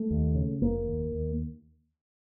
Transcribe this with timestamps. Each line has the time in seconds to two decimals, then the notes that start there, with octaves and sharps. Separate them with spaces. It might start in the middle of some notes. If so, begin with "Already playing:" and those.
Already playing: A3
0.10 D#2
0.35 C#3
0.61 F1 A#3
0.86 D#2
1.12 D#2